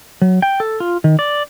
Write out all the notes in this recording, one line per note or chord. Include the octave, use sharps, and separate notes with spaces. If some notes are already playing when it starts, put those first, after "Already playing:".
F#3
G5
A4
F4
D#3
D5